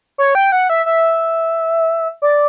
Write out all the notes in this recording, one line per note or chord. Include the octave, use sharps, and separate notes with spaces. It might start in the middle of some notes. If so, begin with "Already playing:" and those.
C#5
G5
F#5
E5
E5
D5